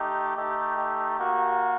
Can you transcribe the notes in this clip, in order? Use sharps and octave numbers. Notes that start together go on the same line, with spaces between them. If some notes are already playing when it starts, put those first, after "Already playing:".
Already playing: A3 D#4 G4
A3 D#4 G4
G4
A#3 F#4